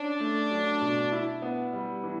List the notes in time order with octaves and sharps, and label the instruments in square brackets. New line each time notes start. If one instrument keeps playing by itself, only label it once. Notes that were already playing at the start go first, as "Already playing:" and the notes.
Already playing: [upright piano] C#4 [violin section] D4
[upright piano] A3
F#3
B2
E4
B3
G3
E3